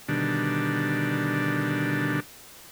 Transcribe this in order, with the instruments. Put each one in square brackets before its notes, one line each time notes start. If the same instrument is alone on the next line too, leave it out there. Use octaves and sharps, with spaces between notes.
[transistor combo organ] B2 D3 D#3 G3 D4